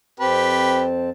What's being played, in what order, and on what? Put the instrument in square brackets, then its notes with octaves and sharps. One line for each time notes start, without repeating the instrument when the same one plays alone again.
[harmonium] F2 C4 A5 [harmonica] G4 B4